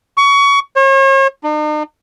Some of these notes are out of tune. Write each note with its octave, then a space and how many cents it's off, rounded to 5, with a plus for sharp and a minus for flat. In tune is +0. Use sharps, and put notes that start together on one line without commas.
C#6 +25
C#5 -40
D#4 -45